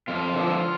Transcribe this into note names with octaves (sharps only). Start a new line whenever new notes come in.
F2 F4
D3 F3